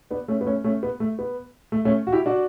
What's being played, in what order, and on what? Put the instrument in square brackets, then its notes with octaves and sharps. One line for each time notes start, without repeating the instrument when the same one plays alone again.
[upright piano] B3 D4
A3 C#4
B3
A3 C#4
A3 C#4
B3
A3
B3
A3
A3 C#4
F#4
E4 G4
D4 F#4